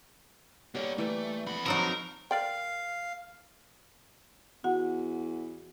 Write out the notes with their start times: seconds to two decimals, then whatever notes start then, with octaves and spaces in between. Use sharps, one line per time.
0.75 G3 A#3 B3 C#5
0.98 E3 A3 G5
1.46 F2 F#5 B5
1.66 F3 F#3 D#4 A#4
2.31 A#4 D5 F5 G5
4.64 E2 F#4 F#5